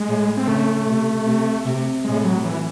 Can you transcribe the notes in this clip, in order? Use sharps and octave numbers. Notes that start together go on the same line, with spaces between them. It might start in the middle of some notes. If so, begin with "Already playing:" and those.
Already playing: G#3
A2
C4
C#3 A3
C3
C3
C3
A2 G#3
F#3
E3